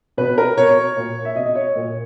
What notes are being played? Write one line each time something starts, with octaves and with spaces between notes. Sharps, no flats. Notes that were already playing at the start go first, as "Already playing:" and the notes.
B2 B4
A#4
B2 C#5
A#2
E5
B2 D#5
D#5
C#5
A#2